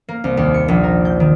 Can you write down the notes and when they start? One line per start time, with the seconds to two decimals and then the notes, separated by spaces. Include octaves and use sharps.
0.08 A#3
0.24 C2
0.37 D#2
0.54 C#7
0.68 A#1
0.83 A#4
1.05 G6
1.20 D#3